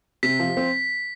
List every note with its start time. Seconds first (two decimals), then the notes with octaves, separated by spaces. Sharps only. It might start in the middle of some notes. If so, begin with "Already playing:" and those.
0.23 C3 B6
0.40 F3
0.57 C4